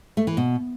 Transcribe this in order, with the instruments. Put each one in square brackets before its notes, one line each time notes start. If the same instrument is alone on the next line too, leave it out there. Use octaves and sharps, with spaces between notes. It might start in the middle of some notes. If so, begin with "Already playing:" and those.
[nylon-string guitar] A3
E3
B2